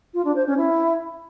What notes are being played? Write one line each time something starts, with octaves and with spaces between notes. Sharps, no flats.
F4
D4
C5
C#4
E4